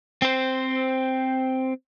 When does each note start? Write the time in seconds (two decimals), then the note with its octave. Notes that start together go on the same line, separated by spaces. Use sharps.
0.22 C4 C5